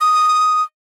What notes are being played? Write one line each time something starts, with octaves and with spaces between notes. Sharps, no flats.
D#6